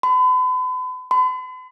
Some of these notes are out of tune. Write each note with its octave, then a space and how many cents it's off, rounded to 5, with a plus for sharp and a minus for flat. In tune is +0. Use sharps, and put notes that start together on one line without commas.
B5 +40
B5 +45